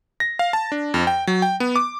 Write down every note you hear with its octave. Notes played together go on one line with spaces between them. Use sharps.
A#6
F5
A5
D4
F2
G5
F#3
G5
B3
D6